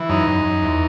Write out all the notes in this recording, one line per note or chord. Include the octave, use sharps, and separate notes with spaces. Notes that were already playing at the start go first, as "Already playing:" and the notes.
Already playing: E3
F#2 D#4
F#2
F#2
E2